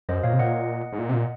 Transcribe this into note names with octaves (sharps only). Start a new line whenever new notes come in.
F#2 C5 D#5
A#2 C#5 F5
C3
A#2 D#5 F#5
G#2
A#2
C3
A#2